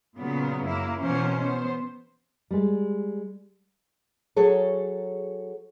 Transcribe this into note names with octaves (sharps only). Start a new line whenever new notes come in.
A#2 C#3 F#3 B3
F#2 A#3 E4
B2 E3 A#3 C#4 C5
B3 C5
G3 G#3
F#3 G#4 A4 C#5